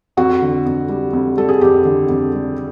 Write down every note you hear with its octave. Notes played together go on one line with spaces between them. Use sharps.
F2 F#4
D3
F2
G3
F2
G3 A4
G#4
F2 G4
D3
F2
G3